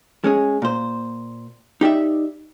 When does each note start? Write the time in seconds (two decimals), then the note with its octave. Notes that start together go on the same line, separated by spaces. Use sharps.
0.24 G#3 C#4 G#4
0.62 A#2 C5
1.81 D#4 G4 D5 E5